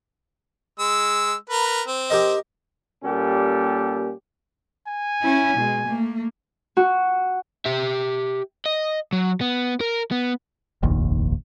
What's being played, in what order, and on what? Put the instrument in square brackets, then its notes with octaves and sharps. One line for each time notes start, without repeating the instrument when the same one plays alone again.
[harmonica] G#3 E6
A#4 B4
C4
[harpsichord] G4 A#4 D#5
[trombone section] A#2 G3 A#3 C#4 G4 A4
[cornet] G#5
[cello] C#4 E4
B2 G#3
A3 A#3
[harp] F#4
[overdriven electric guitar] G4 E5
D#5
F#3
B3
A#4
B3
[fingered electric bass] F1 A#1 D#2